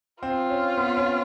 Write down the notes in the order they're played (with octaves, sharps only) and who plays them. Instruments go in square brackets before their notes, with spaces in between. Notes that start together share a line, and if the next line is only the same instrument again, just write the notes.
[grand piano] C4 [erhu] F4
[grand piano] C#4
B3
C#4